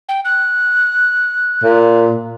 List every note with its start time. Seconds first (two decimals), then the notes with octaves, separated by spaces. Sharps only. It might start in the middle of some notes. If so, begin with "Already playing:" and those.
0.09 G5
0.25 F#6
1.63 A#2